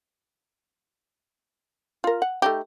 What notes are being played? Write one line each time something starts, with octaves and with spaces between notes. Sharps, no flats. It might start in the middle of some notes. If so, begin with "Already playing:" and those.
F4 A#4
F#5
A3 D#4 G4